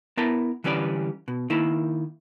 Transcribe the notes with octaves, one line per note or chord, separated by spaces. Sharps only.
B3 E4 A#4 A5
D3 E3 G3 C#4 B4 D5
B2
D#3 A#3 E4